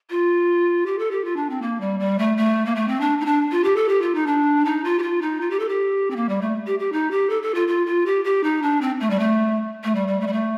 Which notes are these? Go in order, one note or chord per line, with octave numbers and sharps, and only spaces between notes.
F4
G4
A4
G4
F4
D4
C4
A#3
G3
G3
A3
A3
A#3
A3
C4
D4
D#4
D4
F4
G4
A4
G4
F4
D#4
D4
D#4
F4
G4
F4
D#4
F4
G4
A4
G4
C4
A#3
G3
A3
G4
G4
D#4
G4
A4
A4
F4
F4
F4
G4
G4
D#4
D4
C4
A3
G3
A3
A3
G3
G3
A3
G3
A3